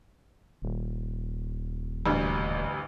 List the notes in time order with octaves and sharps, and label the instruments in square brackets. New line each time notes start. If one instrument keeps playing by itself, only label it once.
[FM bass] D#1
[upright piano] A1 D2 G2